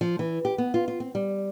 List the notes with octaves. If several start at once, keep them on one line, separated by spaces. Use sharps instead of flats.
F3
E3
G4
B3
F4
F4
C4
G3